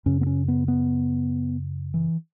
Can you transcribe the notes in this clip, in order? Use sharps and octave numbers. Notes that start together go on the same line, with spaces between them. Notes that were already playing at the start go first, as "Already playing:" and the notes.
F#2 C#3 C#4
B3
C#4
B3
B3
E3